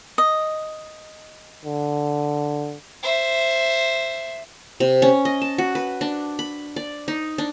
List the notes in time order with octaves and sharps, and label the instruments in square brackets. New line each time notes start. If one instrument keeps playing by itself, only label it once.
[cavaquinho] D#5
[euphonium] D3
[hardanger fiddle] C5 E5
[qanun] C3
C#4
D#5
A5
F#4
B4
D4
B5
D5
D#4
D4